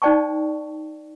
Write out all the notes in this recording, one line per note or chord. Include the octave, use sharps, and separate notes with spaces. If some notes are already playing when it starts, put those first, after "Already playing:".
D#4 C5 D5 G5 A5 C#6